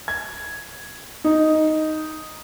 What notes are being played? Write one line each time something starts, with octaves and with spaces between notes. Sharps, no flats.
G#6
D#4